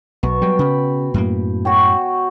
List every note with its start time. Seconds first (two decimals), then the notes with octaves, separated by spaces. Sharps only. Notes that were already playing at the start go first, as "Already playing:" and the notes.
0.23 B1 B2 C#6
0.42 F#3 G3 G5
0.59 C#3 B5
1.14 F#2 A2 A#3
1.65 F#4 C#5 G5